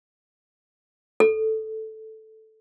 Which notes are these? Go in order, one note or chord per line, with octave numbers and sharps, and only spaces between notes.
A4